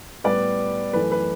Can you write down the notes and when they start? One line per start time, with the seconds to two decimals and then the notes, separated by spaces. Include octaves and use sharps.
0.24 A2 G3 B3 B4 D5
0.93 F#2 E3 A3 B4
1.12 B4